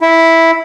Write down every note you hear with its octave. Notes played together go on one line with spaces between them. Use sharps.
E4